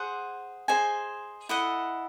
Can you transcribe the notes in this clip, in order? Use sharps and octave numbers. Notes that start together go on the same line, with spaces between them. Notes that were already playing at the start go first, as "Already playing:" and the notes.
Already playing: G#4 C5 F#5
G#4 C5 D#5 G#5
E4 A4 D#5 F#5